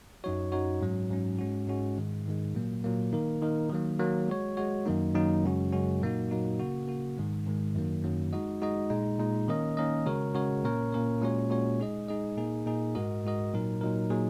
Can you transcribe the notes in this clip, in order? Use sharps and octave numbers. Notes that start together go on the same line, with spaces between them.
F#2 F#3 D#4 F#4 C#5
F#2 F#3 D#4 F#4 C#5
G#2 F#3 C#4
G#2 F#3 C#4
G#2 G#3 C#4 F#4
G#2 G#3 C#4 F#4
G#2 D#3 G#3
G#2 D#3 G#3
A#2 F#3 A#3
A#2 F#3 A#3
D#3 A#3 D#4 A#4
D#3 A#3 D#4 A#4
D#3 F#3 A#3
D#3 F#3 A#3
G#3 F#4 C#5
G#3 F#4 C#5
F#2 D#3 F#3 A#3 D#4
F#2 D#3 F#3 A#3 D#4
F#2 C#3 G#3 C#4 F#4
F#2 C#3 G#3 C#4 F#4
A#2 F#3 A#3 D#4 F#4
A#2 F#3 A#3 D#4 F#4
C#3 A#3 F#4
C#3 A#3 F#4
G#2 D#3 G#3
G#2 D#3 G#3
F#2 D#3 F#3 A#3
F#2 D#3 F#3 A#3
G#3 D#4 F#4 D#5
G#3 D#4 F#4 D#5
A#2 G#3 D#4
A#2 G#3 D#4
D#3 A#3 C#4 A#4 D#5
D#3 A#3 C#4 A#4 D#5
C#3 G#3 F#4 A#4 C#5
C#3 G#3 F#4 A#4 C#5
A#2 A#3 C#4 A#4 C#5
A#2 A#3 C#4 A#4 C#5
A#2 G#3 C#4 F#4 C#5
A#2 G#3 C#4 F#4 C#5
G#3 D#4 G#4 D#5
G#3 D#4 G#4 D#5
A#2 A#3 D#4 G#4
A#2 A#3 D#4 G#4
G#2 G#3 F#4 A#4 D#5
G#2 G#3 F#4 A#4 D#5
A#2 F#3 D#4 A#4
A#2 F#3 D#4 A#4
A#2 F#3 A#3 D#4 G#4